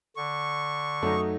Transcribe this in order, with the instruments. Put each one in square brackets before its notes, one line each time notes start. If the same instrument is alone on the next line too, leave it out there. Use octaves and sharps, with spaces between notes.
[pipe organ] D3 [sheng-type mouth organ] C#6
[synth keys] F#2 F#3 D#4 [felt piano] A3